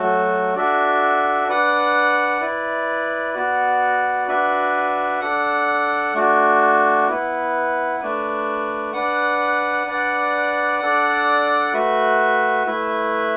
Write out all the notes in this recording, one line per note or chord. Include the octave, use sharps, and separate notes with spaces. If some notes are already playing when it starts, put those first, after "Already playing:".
Already playing: F#3 A3 F#4 A4
D4 F#4 A4 E5
D4 B4 F#5
E4 B4 D5
B3 F#4 D5
D4 F#4 B4 E5
D4 A4 F#5
A3 D4 F#4
B3 E4 B4
A3 D4 B4
D4 B4 F#5
D4 B4 D5 F#5
D4 A4 D5 F#5
A3 F#4 B4 E5
A3 E4 B4 E5